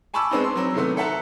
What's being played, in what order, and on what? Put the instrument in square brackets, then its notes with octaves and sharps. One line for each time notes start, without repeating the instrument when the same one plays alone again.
[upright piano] G#5 A5 B5 C#6 D6 E6
G#3 B3 C4 D4 D#4
C6
F#3 C4
C3 D#3 A3 B3
A4 E5 F#5 A5 A#5